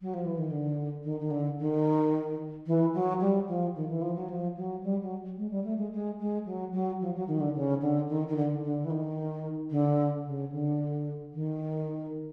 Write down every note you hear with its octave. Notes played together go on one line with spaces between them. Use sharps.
F#3
F3
E3
D#3
D3
D#3
D#3
D3
D#3
E3
F#3
G3
F3
D#3
E3
F3
F#3
F3
F#3
G3
F#3
G#3
G3
A3
G#3
G#3
G#3
F#3
F#3
F3
F#3
D#3
D3
C#3
D3
D#3
D#3
D3
D3
E3
D#3
D3
C#3
D3
D#3